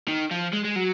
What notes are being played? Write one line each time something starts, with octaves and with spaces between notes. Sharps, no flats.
D#3
F3
G#3
G#3
F#3